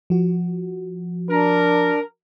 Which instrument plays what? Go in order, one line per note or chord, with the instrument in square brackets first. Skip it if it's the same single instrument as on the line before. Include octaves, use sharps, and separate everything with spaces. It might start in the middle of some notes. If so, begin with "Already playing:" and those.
[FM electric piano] F3 F#4
[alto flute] D4 [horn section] A#4